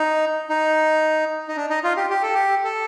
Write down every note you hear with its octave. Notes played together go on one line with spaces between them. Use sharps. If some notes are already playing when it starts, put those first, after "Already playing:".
Already playing: D#4
D#4
D#4
D4
D#4
F4
G4
G4
A4
G4
A4